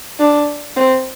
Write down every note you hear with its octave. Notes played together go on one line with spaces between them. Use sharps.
D4
C4